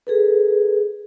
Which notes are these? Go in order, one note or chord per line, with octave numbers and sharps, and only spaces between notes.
G#4 A4 B4